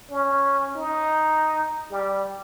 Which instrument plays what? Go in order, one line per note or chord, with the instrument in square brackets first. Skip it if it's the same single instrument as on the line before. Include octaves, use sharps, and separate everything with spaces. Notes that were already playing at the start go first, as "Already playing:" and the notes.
[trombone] C#4
D#4
G3